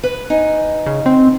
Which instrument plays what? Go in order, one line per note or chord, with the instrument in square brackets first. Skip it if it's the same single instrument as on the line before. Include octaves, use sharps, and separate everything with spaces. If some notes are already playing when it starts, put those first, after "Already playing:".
[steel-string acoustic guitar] B4
D#4 G#5
[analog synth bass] C#3
C4